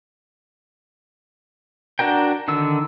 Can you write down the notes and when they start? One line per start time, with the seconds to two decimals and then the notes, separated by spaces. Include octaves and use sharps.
1.99 D4 F#4 A#4 G5
2.48 D3 D#3 E6